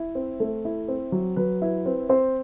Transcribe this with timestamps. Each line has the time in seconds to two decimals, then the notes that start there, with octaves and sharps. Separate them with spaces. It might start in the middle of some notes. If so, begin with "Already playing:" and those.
Already playing: E4
0.15 C4
0.40 A3
0.65 E4
0.88 C4
1.12 F#3
1.36 F#3 B4
1.62 E4 B4
1.85 C4 B4
2.09 C4 C5